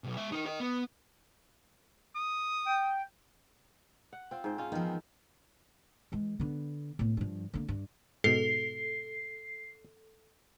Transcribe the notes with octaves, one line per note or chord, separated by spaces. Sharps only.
B1 A#2
G#3 E5
D#4 A#4
A#4 D#5
B3
D#6
G5
F#5
C4 F4
G#2 C5
C#4 F4
D#3 F3 B3 C4
E3 G#3
D3 B3
A2 B3
G2 F3
D3 A#3
G2
G#2 B2 A4 C7